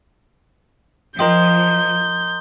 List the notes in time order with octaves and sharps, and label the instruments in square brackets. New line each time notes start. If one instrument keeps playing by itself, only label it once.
[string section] F3 [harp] A#4 D#5 G5 [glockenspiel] A#5 C6 D#6 [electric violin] G6